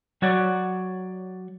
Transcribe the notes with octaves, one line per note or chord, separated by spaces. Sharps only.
F#3 F#4 C#5 D5